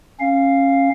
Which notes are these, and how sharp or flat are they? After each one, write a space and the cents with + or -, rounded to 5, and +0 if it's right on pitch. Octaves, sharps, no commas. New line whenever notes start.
C#4 -20 F5 +0